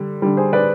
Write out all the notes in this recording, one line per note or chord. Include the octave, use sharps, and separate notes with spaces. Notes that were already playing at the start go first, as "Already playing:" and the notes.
Already playing: D3 G3
D3 G3
G#4 C5
B4 D5